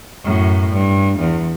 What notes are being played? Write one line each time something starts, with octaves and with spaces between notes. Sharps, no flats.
F#2 A2
G2
E2